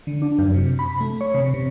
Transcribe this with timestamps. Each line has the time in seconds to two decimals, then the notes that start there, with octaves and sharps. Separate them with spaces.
0.07 D3
0.22 D4
0.38 F#2
0.54 C3
0.79 B5
1.01 A3
1.21 C#5
1.34 C3
1.54 C3